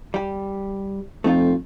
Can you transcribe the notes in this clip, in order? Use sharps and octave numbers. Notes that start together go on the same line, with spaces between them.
G3 G4
F2 A3 D#4 F4